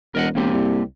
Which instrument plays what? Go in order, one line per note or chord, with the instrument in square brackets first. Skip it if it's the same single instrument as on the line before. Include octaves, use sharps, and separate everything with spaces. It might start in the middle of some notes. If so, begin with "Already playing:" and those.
[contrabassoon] E1 [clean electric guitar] A#4 D#5 F#5
[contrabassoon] E1 [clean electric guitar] A#3 C4 G4
[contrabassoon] C2